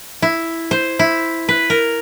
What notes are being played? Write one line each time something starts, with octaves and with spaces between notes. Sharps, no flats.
E4
C5
E4
B4
A#4